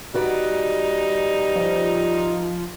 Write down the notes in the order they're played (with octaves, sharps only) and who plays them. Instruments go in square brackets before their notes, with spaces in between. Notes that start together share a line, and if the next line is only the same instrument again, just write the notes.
[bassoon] G3 [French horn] D#4 [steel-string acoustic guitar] F#4 B4 D5
[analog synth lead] F3